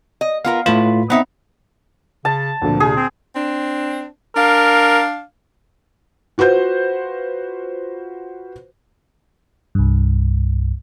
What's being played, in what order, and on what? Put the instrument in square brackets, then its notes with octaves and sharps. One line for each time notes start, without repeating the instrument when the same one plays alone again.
[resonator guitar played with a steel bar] D#5
[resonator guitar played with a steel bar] B3 F4 A#4 [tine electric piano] F5
[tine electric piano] A2 A3 F4 [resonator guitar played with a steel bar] B4
[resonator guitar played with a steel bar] B3 D#4 E5 [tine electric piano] C4
[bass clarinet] C#3 [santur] A5
[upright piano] D2 A#2 D3 [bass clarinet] F3
[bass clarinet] C3 [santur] G#4
[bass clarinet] C4
[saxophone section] C4 D4
[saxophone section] D4 F5 [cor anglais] A#4
[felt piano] F4 F#4 B4 C5 G6
[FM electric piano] C2 G2